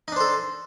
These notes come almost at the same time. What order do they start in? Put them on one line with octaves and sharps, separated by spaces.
D#4 D4 C5 A4